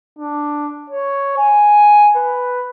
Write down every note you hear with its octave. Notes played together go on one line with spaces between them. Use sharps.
D4
C#5
G#5
B4